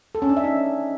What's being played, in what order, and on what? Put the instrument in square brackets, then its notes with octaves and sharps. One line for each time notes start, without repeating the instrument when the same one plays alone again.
[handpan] A4
C#4
D4
E5
D#4